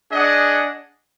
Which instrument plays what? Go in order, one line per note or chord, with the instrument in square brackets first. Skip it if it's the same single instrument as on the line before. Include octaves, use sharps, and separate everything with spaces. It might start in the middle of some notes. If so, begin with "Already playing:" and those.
[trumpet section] D4 G#4 D#5 F#5